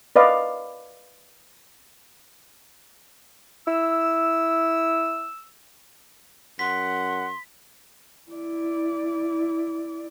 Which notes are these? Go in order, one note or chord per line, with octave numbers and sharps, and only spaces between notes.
B4 D5 D#5 F5
E4 E6
F#2 F#5 C6 B6
E4 D5